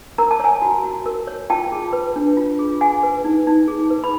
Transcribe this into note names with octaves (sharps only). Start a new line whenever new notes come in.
A#4 A#5
A5
C#5 G#5 A#5
F#4
F#4
A#4
C#5
F4 G5 A5
G#4
B4
D4
F4
G#4
G#4 F#5 G#5
B4
D#4
D#4
G#4
B4
B5